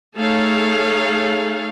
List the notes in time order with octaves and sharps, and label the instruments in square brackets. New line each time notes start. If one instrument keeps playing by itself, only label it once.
[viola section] A3 D#4 G#4 A4 C#5 F5